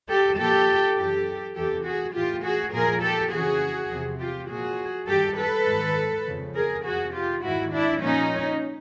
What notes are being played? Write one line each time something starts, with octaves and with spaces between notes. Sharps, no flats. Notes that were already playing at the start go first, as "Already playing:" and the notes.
G4 A4
A#2 F3 G4 A4
F#2 C#3 E3 G4 A4
E2 C3 E3 G4 A4
F#4 G#4
A2 E3 F4 G4
F#4 G#4
A#2 F3 G#4 A#4
G4 A4
F2 C#3 E3 F#4 G#4
E2 C3 F3
F4 G4
A#2 F3 F#4 G#4
G2 D#3 G4 A4
A4 B4
G#2 D#3
F2 C#3 F3
G#4 A#4
F2 C3 F3 F#4 G#4
F4 G4
G#2 D#3 E4 F#4
D4 E4
A#2 F3 C#4 D#4